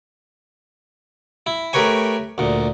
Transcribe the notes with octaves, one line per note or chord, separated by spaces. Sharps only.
E4
A3 G4 A#4 B4 C#5 G#5
D2 A#2